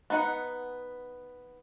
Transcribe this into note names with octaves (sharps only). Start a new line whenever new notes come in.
B3 D#4 F#5